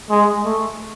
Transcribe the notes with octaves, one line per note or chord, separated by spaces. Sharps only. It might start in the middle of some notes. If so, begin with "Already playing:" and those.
G#3
A3